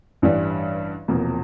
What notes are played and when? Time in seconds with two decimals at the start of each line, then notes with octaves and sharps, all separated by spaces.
0.22 A1 G2 E3 G3
1.08 E1 E2 C3 F3 A#3